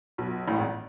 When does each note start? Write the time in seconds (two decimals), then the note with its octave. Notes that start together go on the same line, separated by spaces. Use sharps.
0.18 B1 B2
0.47 A1 A2
0.57 G#1 G#2